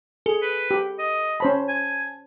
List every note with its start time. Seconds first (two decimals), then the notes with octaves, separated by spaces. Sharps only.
0.26 G#4 A4
0.42 B4
0.71 G4
0.99 D#5
1.40 C#4 C5 A5 B5
1.69 G#5